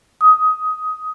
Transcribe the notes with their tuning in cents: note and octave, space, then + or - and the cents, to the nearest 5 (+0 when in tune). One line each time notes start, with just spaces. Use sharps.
D#6 +20